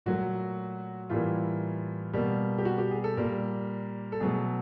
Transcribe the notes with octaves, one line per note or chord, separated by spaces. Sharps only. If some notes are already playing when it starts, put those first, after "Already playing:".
A#2 F#3 A3 F#4
A2 E3 G3 A#3 F4
B2 G3 A#3
G4
F#4
G4
G#4
A4
A#2 G3 A#3 A#4
A4
B2 F#3 A3 G#4